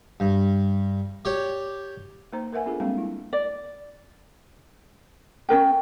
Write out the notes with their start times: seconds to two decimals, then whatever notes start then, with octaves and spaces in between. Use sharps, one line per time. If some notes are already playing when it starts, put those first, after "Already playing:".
0.20 G2
1.25 G4 C#5 D5
2.33 A#3 D#4 C5 A#5
2.53 A#4 B4 E5 F#5 G#5
2.66 B3 D4 F4 G#4 A4
2.80 G3 G#3 A#3 C4 D4 F5
2.98 E4
3.33 D5
5.49 C#4 D4 A#4 G5